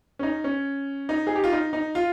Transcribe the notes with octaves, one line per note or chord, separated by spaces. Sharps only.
C#4
D#4
C#4
D#4
G#4
G4
F4
D#4
D#4
F4